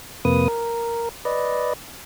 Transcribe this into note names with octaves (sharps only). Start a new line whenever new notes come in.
F2 C3 A#3 B4 D#6
A#4
B4 D5 D#5